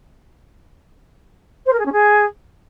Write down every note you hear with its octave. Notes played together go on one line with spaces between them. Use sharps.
C5
A#4
G#4
C#4
G#4